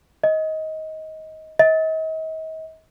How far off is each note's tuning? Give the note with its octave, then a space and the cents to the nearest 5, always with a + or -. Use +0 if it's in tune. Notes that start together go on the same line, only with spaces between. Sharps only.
D#5 +20
D#5 +40